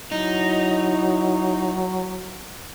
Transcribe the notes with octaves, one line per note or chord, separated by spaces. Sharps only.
F#3 D#4 E4